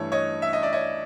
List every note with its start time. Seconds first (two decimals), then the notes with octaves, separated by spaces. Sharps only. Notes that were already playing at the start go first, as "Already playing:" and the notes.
Already playing: G2 E3 A3 C#5
0.12 C#5 D#5
0.42 E5
0.53 D#5
0.63 D5 E5
0.73 C#5 D#5